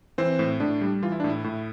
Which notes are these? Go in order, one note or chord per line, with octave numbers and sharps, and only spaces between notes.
E3 C4 C5
A2
A2 D4
G3
E3 F4
E4
D4
A2
E4
A2